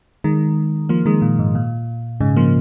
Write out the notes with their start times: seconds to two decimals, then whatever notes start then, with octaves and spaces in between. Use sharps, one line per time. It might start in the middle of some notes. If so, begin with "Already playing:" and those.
0.24 D#3 G#3
0.89 F3 A#3
1.06 D#3 G#3
1.22 A#2
1.39 G#2
1.55 A#2
2.20 G#2 C#3
2.36 F3 A#3